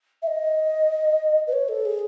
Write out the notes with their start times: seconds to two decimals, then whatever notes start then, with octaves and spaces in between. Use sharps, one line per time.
0.22 E5
0.27 D#5
1.47 B4
1.53 C#5
1.68 A4
1.85 G#4